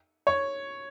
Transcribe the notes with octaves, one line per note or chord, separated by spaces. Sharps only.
C#5